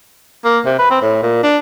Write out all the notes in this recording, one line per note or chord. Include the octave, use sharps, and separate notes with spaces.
A#3
C3
B4
C4
A2
A#2
D4